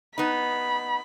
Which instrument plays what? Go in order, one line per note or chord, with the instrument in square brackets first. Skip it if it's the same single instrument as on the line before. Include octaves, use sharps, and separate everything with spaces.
[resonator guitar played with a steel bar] B3 D#4 [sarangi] B5